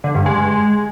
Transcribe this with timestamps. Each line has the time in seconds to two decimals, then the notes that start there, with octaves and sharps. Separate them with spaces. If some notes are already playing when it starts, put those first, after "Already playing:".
0.04 D3
0.15 G2
0.26 G#3